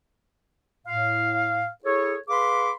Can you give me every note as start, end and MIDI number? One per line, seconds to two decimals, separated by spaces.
0.86 1.66 45
0.86 1.66 77
1.84 2.15 64
1.84 2.15 68
1.84 2.15 69
1.84 2.15 73
2.28 2.71 68
2.28 2.71 71
2.28 2.71 77
2.28 2.71 83
2.28 2.71 84
2.28 2.71 86